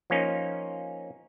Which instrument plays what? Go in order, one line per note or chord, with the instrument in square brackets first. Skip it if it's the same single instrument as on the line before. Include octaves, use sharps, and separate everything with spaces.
[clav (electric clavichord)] F3 A#3 C#4 D#4